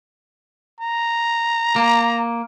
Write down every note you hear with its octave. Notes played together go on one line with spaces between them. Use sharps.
A#5
A#3